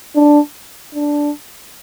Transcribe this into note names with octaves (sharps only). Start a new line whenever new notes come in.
D4
D4